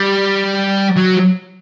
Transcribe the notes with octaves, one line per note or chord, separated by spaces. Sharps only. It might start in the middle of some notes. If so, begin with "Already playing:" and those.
Already playing: G3
F#3